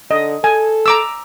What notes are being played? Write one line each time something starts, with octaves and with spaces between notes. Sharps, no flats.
D3 D#5
A4 G#5
A#5 D6 E6